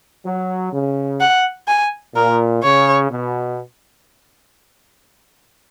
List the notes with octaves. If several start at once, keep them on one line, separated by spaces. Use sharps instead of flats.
F#3
C#3
F#5
G#5
A#2 A#4
C#3 C#5
B2